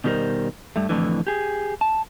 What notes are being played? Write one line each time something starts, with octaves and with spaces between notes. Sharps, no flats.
B2 D#3 G3 G4 A#4 C5
G2 A3
F2 A2 D3 E3
G4 G#4
A5